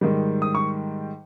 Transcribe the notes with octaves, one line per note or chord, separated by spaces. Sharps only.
G#2 D#3 G3
D#6
C#6